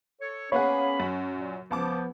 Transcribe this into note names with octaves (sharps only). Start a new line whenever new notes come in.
A4 C#5
A#3 B3 C#4 G#4 C#5 F#5 B5
F#2
A#2
C#2 F3 B3 A5 D6